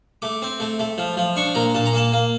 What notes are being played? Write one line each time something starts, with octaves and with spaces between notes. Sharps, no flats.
A3 D6
C4
A3
A3
F3
F3
D4 C#6
A#2 A#5
A#2 A5
A#5
A#3 A5
A#3